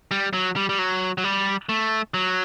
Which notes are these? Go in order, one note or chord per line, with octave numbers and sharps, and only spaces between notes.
G3
F#3
G3
G3
F#3
F#3
G3
A3
F#3